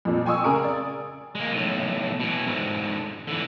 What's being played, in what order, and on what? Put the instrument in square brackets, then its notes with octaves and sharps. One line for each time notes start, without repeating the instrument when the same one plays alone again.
[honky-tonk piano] F2 A#2
G5 G#5 C6 C#6 D#6 E6
C#3 G#4 A#4 D7
D5
[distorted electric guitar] G#3 A#3
B1 A2
B2 E3
G#2 D3
D3 E3